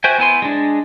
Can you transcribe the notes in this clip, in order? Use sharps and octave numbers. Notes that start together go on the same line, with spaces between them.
F#4 C5 E5 G5 G#5
B3 E4 G#5 C6
G#3 D4